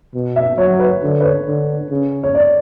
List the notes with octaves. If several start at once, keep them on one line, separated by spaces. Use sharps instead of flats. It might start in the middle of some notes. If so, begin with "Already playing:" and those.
B2
E5
F#3 C#5
B4
D3
B4
C#5
D3
C#3
C#5
D5